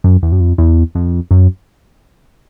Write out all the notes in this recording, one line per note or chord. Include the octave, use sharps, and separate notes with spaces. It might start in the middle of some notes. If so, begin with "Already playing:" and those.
F#2
E2
F#2
F2
E2
F2
F#2